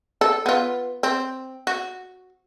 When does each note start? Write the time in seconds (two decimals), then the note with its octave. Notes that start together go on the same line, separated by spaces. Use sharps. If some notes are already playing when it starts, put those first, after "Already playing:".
0.21 A4
0.46 B3 F4
1.03 C4
1.67 F#4